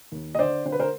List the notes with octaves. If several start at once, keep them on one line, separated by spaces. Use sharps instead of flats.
D#2
D#5
D3 C5 D5
D3 C5
B4
A#4 C5